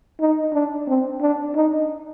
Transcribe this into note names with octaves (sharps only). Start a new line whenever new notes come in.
D#4
D4
C4
D4
D#4